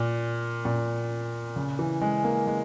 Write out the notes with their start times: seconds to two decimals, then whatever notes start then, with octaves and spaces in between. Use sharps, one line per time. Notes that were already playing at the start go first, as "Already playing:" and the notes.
Already playing: A#2
0.65 A#2
1.56 C#3
1.79 E3
2.01 G#3
2.24 A#3
2.47 G#3